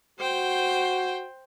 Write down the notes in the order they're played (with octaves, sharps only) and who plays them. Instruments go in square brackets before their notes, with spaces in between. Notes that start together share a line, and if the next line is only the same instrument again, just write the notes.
[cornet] F#4 [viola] C5 G5